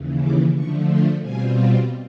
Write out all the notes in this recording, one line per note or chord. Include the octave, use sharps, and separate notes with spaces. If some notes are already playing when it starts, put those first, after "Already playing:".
Already playing: D#2 C#3 E3
D6
D3 F3 A3 C#6
C6
B2 G3 C4 F4 G#5